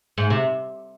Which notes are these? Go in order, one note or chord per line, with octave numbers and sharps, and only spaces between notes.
G#2
C3